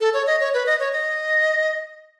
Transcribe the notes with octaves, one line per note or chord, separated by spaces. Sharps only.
A4
C#5
D#5
C#5
B4
D#5
C#5
D#5